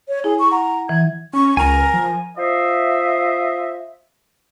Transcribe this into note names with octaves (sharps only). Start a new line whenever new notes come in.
C#5
E4 G#4
C#6
F#5 A#5
E3 G#6
C#4 C#6
C#2 A#4 G#5 A#5
F3
F4 C5 D#5 E5